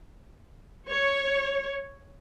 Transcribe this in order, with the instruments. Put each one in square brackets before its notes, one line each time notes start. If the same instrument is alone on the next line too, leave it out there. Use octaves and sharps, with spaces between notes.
[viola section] C#5